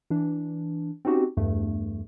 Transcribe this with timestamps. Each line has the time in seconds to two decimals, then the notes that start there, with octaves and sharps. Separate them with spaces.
0.10 E3 D4
1.05 C4 C#4 D#4 F#4 G4
1.37 E2 G2 A3